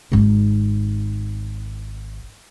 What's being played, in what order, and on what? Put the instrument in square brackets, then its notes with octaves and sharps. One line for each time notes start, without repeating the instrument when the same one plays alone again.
[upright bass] G#1 D#4